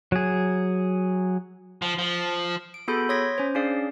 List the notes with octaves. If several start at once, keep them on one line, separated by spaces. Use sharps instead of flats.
F#3 G#4
F3
F3
D7
B3 F#4 G#4 A4 B5 G6
C#5 C6 D#6 G#6 A#6 B6
C#4 C5
C#4 D4 G#4 D5 F5